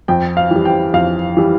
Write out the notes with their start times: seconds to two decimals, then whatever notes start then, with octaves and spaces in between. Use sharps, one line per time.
0.08 F2 G5
0.37 F5
0.51 E3 G3
0.65 G5
0.94 F2 F5
1.37 E3 G3